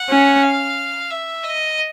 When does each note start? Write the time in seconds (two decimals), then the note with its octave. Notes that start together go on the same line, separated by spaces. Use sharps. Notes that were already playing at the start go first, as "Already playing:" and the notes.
Already playing: F#5
0.10 C#4
0.43 F5
1.10 E5
1.44 D#5